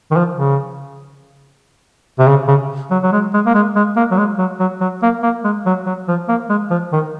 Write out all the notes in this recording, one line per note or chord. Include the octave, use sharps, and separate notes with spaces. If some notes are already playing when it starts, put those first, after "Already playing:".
D#3
F3
C#3
C3
C#3
C#3
F#3
F#3
G#3
G#3
A#3
G#3
G#3
A#3
F#3
G#3
F#3
F#3
F#3
A#3
A#3
G#3
F#3
F#3
F3
A#3
G#3
F3
D#3